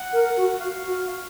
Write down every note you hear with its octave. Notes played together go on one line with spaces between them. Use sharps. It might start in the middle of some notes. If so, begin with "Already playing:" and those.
Already playing: F#5
A#4
F#4
F#4 F5
F#4
F5